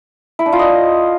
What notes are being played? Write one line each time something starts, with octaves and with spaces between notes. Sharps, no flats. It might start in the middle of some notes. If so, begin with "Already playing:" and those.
E4
D4
F4
D#5